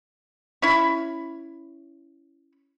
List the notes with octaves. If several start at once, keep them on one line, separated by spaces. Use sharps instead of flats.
C#4 E4 B5